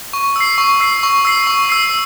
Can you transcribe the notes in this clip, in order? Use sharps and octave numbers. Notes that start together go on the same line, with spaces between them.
C#6
E6 C7
C#6
E6 C7
C#6
E6 C7
C#6
E6 C7